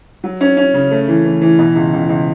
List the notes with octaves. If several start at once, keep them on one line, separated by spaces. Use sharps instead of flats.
F#3
C#4
C#4
C#3
A3
E3
E3
E3
B2
C#2
C#2
C#2